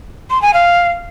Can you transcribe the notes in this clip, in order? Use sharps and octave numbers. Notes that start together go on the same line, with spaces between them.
C6
G#5
F5